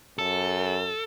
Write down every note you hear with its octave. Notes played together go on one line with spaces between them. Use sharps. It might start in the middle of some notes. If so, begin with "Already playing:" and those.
F#2 A4